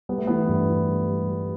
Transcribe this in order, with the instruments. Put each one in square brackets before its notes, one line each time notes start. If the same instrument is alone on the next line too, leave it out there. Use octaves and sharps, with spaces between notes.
[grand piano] G3 B3
A3
E3 B3
G2
E3
G3
G3
G3